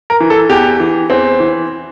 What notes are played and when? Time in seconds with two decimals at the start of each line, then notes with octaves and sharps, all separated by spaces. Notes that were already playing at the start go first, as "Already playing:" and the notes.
0.10 A#4
0.20 E3
0.30 A4
0.49 E2 G4
0.80 E3
1.10 E2 C4
1.40 E3